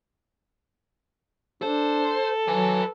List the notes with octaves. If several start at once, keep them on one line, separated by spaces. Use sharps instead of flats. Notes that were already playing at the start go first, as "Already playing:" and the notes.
D4 A4 C5
F#3 B4 G#5